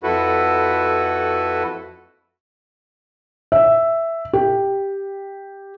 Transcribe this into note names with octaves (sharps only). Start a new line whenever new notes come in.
F2 E4 F#4 A4 B4
E5
G4